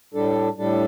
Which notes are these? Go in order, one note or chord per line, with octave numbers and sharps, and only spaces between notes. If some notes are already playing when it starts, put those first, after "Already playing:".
A2 G3 D4 A4
A2 G3 D4 A4